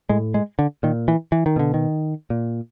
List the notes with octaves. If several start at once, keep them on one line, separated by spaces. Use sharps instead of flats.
A2 G#3
G#3
D3
A#2 D#3
E3
E3
D#3
B2 D3
D#3
A#2